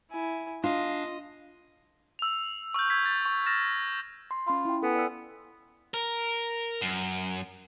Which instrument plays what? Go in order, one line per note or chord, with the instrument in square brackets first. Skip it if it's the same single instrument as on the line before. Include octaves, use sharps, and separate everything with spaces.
[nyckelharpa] E4 G#5
[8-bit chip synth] D4 F5 [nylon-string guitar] F4 [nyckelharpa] D#5
[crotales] E6 F7
C#6 E6 F6 G6
E6 G6 G#6 B6
A6
C#6
F6 A6 A#6 E7
[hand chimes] C6
[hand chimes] C#4 B5 [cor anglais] F4
[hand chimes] E4 G5
[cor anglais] B3 [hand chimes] A4 G#5
[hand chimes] D5 E6
[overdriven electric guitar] A#4
F#2